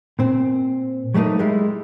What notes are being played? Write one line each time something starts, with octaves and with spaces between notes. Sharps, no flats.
A#2 C4
F#3 G3 A3 A#3 D#4
G3 G#3 E4